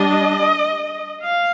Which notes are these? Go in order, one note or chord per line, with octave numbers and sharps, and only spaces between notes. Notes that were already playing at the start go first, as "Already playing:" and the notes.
Already playing: G3 D4 D#5
F5